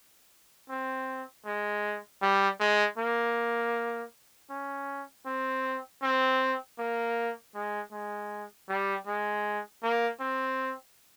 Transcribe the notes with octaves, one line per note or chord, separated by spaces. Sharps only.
C4
G#3
G3
G#3
A#3
C#4
C4
C4
A#3
G#3
G#3
G3
G#3
A#3
C4